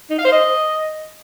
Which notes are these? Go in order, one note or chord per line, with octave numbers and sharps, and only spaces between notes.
D#4
F5
C5
D#5